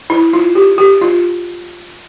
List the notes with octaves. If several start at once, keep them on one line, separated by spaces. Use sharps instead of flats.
E4
F4
G4
G4
F4